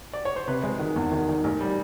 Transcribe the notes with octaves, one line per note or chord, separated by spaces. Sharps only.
D5
C#5
C5
C3 B4
G#3
D#3
E2
D#3
D#3
A1
G3